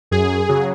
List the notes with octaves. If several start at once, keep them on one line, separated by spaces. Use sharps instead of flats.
F#2 G#4
C#3 F#3